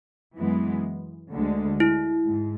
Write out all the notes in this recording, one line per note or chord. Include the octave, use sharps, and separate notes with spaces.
F#2 E3 G#3 B3
D2 D3 G#3
E4
G#2